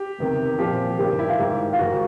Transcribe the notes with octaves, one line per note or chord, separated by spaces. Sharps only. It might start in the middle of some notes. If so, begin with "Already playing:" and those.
Already playing: G4
E2 C3 D#3
A#2 F3 G4
G2 D#3 G4
E4
F4
G#2 D#3 G4
F4
G#2 D#3 F#4